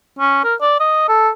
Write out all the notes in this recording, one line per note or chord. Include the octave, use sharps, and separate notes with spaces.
C#4
A#4
D5
D#5
A4